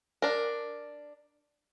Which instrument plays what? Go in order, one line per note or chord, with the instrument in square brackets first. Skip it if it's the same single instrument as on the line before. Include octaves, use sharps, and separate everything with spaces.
[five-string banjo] D4 A#4